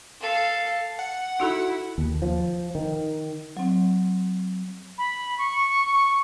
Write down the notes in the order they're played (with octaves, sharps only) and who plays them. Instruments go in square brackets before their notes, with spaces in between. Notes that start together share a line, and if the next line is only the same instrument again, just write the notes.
[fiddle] A4 F5
[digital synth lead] F#5
[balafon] D#4 F#4 A4 [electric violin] E4
[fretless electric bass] D#2
F3
D#3
[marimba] F#3 C4
[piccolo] B5
C#6